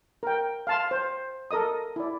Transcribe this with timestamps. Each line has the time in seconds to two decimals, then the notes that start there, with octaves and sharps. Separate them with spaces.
0.23 A#4 G5
0.67 F5 A5 C6
0.91 C5
1.51 A4 A#4 D#5 D#6
1.96 E4 D5